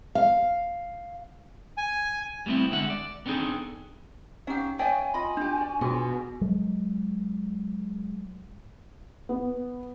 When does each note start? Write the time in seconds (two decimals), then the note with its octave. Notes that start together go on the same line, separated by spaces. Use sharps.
0.15 F5
1.78 G#5
2.46 G3 A3 B3 C4 E4
2.71 D3 G#3 E5 F#5
2.90 D5
3.26 B3 C4 D4 D#4 G#4 A4
4.47 C#4 D#4 G4 F5 F#5
4.79 C#5 D5 E5 F5 G5 G#5
5.14 F4 D#5 B5
5.37 D4 F4 G4
5.58 F#4 D5
5.81 B2 F4 F#4 G#4 G5
6.41 F#3 G#3
9.29 B3